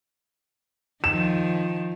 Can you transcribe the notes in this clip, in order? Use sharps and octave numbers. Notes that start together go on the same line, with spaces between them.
D#3 F3 E7